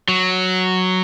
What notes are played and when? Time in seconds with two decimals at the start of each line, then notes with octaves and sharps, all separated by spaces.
0.09 F#3